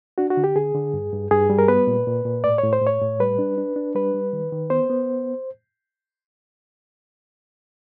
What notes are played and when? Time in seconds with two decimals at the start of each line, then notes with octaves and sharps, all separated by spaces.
0.18 D4 F#4
0.30 F#4
0.37 D3
0.44 G4
0.56 D3 G#4
0.74 D3
0.94 G2
1.13 G2
1.31 G2 G#4
1.50 G3
1.59 A#4
1.68 B3 B4
1.87 A#2
2.07 A#2
2.25 A#2
2.44 A2 D5
2.58 C#5
2.64 A2
2.73 C5
2.82 A2 C#5
3.01 A2
3.20 G3 B4
3.39 D4
3.58 D4
3.76 D4
3.95 G3 B4
4.14 G3
4.33 D#3
4.52 D#3
4.70 B3 C5
4.90 B3